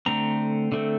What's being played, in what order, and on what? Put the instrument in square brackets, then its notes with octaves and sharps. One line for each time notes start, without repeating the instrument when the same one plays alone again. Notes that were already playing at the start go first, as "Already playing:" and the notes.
[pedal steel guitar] D3 A3 C4 A#5
D3 A3 C4